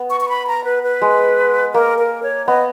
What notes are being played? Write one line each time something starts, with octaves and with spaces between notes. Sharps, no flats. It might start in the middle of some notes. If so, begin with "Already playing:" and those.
Already playing: B3
C#6
C#6
B5
A#5
B4
B4
G#3
A#3 A#4
A#4
C#5
B3 D#5